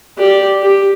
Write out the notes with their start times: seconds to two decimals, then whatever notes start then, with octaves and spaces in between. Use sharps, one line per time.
0.18 G4 D5
0.63 G4